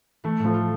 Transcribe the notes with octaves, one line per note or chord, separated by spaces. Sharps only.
E3 A3
A2
F3
F4